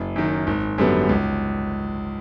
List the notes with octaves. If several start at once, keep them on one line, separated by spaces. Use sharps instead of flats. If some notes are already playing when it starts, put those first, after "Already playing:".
Already playing: F#1
F#2 D#3
G#1
F#2 D3 G3 B3
C#2